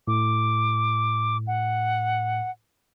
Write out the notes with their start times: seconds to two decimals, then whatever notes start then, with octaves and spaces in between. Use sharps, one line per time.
0.08 A2 D6
1.47 F#5